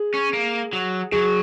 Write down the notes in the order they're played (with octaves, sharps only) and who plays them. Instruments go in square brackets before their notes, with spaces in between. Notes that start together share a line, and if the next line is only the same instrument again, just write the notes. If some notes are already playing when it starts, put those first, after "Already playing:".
Already playing: [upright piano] G#4
[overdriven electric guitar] C#4
A#3
F#3
[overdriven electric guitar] F#3 [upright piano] G#4